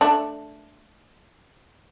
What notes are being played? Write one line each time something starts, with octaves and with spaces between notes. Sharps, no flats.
A3 D4